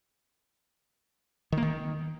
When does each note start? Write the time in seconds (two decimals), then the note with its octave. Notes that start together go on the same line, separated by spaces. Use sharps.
1.52 D#3
1.57 A#3
1.62 D#3